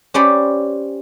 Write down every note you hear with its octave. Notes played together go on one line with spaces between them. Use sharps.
C#4 G4 C5 D5 B5